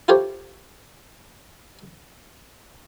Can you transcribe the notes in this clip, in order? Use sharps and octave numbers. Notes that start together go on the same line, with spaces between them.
E4 F4 G4 A4 C5 C#5